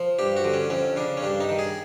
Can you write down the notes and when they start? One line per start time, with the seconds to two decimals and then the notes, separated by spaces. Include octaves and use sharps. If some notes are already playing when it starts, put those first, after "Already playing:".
Already playing: F3
0.19 G2 G4
0.37 F#4
0.44 D3
0.54 C#4
0.70 F2 C#4
0.96 C#3 D4
1.17 C#4
1.23 G2 D4
1.40 D#4
1.49 D#3
1.59 G#4